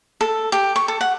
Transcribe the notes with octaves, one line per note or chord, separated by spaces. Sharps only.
A4
G4
C#6
A4
F#5